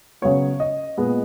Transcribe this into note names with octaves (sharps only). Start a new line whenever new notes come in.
C#3 F#3 B3 C#5
D#5
A#2 G#3 B3